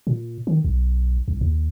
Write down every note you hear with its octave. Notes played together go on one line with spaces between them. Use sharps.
A#2
D#3
B1
C2
D#2